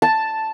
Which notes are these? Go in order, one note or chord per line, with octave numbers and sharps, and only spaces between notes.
A5